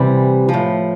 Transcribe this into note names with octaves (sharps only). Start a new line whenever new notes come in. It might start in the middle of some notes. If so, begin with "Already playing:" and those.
Already playing: C3 E3 G3
F3
A2